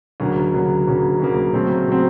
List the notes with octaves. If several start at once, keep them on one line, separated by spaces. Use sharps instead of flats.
D2 C#3 F#3 A#3
D2 C#3 F#3 A#3
D2 C#3 F#3 A#3
D2 C#3 F#3 A#3
C#3 F#3 A3 C4
C#3 F#3 A3 C4